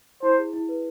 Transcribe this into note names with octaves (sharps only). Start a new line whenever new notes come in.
E4 C5
G#4
E4
B4